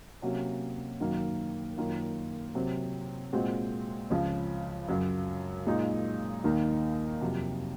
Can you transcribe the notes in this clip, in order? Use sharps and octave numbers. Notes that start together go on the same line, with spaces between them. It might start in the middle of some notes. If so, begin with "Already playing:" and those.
C3 F#3 A#3 C#4 F#4
F#2 D#3 F#3 A#3
F#2 D#3 A#3 F4
C3 F#3 C4
A#2 G#3 C4 F#4
C#2 C#3 F3
F#2 C#3 F#3
A#2 G#3 D#4
D#2 D#3 A#3 D#4
F2 C3 F#3